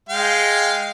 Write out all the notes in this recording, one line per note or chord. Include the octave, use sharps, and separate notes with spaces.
G#3 F5 G5